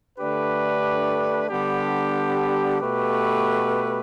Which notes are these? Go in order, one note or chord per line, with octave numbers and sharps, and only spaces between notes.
D3 A3 D4 G4 B4
D3 G3 B3 D4 G4
B2 A3 G4 B4